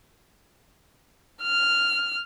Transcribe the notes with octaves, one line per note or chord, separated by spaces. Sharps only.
F6